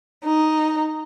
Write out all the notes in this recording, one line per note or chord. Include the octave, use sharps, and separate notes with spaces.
D#4